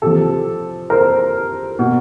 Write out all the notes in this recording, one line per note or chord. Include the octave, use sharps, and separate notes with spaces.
C3 F3 G4 A4
A#4 C5
B2